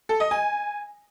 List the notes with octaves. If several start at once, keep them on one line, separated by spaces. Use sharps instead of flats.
A4
D#5
G#5